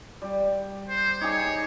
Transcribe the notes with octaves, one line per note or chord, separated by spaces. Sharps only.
G3
C5
D#4 G4 G#4 C#5